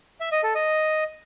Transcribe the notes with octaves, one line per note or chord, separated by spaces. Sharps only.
E5
D#5
A4
D#5